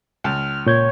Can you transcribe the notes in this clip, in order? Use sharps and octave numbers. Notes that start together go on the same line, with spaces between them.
C#2 A5 F6
A#2 C#5 G6 G#6